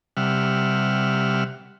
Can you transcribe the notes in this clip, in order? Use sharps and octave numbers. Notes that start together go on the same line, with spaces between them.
C3 G3 E5 F#5 F6